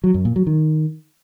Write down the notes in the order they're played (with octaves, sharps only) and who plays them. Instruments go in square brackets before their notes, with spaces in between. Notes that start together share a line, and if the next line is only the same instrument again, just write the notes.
[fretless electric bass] F#3
F#2
A#2
F#3
D#3